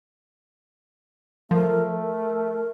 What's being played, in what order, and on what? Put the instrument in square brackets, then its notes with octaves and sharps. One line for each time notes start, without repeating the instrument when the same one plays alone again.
[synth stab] F3 [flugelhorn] A3 [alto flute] A#4
[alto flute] A#4